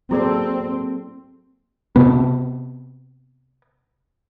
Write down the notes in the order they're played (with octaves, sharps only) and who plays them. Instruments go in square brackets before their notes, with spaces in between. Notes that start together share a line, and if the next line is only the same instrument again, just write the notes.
[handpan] F#3 A#3 A4 [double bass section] C4 [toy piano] E4 G#4 D5
[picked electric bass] C3 B3